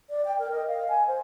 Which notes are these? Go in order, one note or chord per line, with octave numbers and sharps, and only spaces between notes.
D5
G5
A#4
D#5
F5
G#5
C5